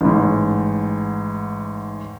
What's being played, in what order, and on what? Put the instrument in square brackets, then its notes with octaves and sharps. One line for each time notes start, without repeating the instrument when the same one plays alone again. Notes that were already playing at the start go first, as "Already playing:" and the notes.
[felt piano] A1 G#2